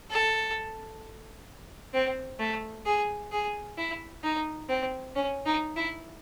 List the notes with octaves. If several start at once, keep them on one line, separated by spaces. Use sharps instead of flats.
A4
C4
A3
G#4
G#4
E4
D#4
C4
C#4
D#4
E4